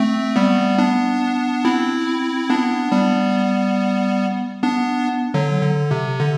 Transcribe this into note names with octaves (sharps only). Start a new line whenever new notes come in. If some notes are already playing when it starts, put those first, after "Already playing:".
Already playing: A3 C4
G3 B3
B3 D4
C4 E4
B3 D4
G3 B3
B3 D4
D3 F#3
D3
C3
D3